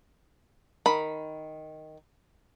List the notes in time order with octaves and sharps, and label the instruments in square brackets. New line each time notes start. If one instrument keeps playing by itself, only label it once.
[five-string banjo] D#3 B5